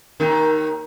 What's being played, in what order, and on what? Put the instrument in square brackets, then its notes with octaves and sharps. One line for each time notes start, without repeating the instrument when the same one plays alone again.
[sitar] D#2 D#3